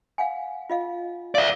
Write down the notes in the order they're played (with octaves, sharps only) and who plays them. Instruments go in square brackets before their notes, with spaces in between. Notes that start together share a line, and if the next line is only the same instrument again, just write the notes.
[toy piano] F5 F#5 G#5
F4 D#5 F5
[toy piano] A#4 F5 [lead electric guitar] D5 E5